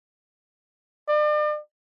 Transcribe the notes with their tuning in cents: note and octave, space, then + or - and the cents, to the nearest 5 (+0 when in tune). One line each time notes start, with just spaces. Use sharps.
D5 +40